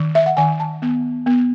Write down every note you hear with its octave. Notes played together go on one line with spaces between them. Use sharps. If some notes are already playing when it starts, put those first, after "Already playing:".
Already playing: D#3
E5
F#5
D#3 G#5
A5
B3
B3